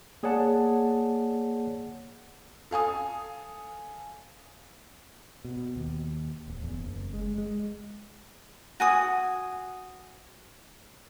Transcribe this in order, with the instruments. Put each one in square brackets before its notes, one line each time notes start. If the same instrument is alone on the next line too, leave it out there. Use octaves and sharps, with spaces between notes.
[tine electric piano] A#3 G#4 C#5 D5 F#5 A5
[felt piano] A4 F5 G#5 D#6
[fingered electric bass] B2
D#2
D1
E2
F#1
G#3
G#3
[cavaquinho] F#4 G#5 D#6